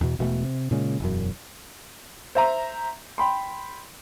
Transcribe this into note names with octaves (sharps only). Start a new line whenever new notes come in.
E2 B2
E1 B2 G#3 A3
C3
A#2 C#3 G#3
E1 F#2
C5 E5 A#5
G5 B5 C6